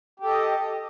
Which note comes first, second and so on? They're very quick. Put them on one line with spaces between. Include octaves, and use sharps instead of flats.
G4 A4 D#5